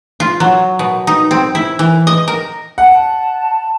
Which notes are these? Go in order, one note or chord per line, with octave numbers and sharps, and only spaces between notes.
F4
F#3
B2
D#4
C4
E4
E3
D#5
A#4
F#5 A5